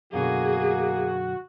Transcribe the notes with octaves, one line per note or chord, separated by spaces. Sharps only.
F#2 B2 D3 A#3 F#4 G#4